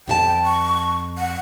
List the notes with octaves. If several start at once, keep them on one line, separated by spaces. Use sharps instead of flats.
F2 F#4 G5 A5
C#6
F#5